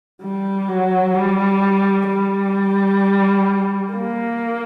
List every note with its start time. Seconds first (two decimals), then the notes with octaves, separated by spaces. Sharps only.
0.22 G3
0.68 F#3
1.15 G3
2.07 G3
3.93 A#3